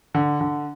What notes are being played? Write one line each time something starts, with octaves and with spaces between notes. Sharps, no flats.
D3
D3